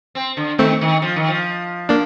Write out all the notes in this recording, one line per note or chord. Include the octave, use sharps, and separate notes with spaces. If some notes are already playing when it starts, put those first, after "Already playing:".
C4
D3
D#3 A3 C4
D#3
F3
D#3
F3
A#3 D4